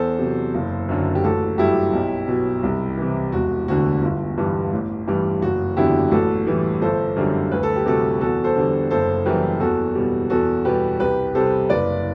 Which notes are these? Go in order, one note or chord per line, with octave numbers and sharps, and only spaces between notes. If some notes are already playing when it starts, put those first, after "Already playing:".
Already playing: E2 A4 C5
C3 F#3
F#1
F#2 D3 F#3
G4
A1 F#4 A4
G2 F#3 E4 G4
B1
B2 F#3
C2
C3 E3
E1 F#4
D2 D3 F#4
G1
G2 E3 G3
A1
G2 E3 G3
F#1 F#4
E2 D3 F#3 E4 G4
A1 F#4 A4
A2 E3 G3
G1 A4 C5
F#2 D3 G3
D2 B4
A4
G4
C3 G3 F#4 A4
E2 F#4 A4
A4 C5
D3 G3
F#1 A4 C5
F#2 E3 G3 G4 B4
E2 F#4 A4
B2 G3
E2 F#4 A4
B2 G3 G4 B4
C2 G4 B4
C3 G3 A4 C5
F#1 B4 D5